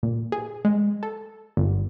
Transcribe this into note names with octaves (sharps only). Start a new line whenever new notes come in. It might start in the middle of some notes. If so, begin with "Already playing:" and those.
A#2
G#4
G#3
A4
G1